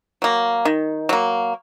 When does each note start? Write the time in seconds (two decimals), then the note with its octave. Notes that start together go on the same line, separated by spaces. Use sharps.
0.22 F#3 A#3
0.65 D#3
1.09 F#3 A#3